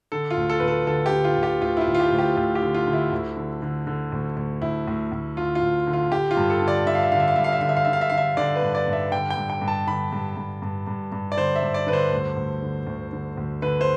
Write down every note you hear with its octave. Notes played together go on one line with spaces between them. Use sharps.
D3 A4
F4
D2
A4
D2 B4
A4
D3 A4
G4
D3
F4
D2
G4
D2 F4
E4
F4
D2
F4
G4
D2
G4
D2 F4
G4
D3
F4
D3
E4
D2
D3
D3
D3
D2
D2
D2 E4
D2
D2
D3 F4
F4
D2
D3
F4
D3 G4
F4
G2
A4
D3
D5
D3 E5
F5
E5
D3 F5
E5
F5
G2 E5
F5
E5
D3 F5
E5
F5
D3 E5
F5
E5
D3 F5
E5
D3 D5
B4
G2
D5
G2
E5
D3 G5
G5
G2
G5
G2
A5
D3 B5
G2
G2
G2
G2
G2
D5
D3 C5
E5
G2
D5
D3 B4
C5
D2
D2
D3
D2
D3
D2
D3 B4
C5